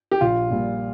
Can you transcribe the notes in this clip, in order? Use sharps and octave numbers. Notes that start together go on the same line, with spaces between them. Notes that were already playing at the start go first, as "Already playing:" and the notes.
G4
A#1 F4
A#2 G3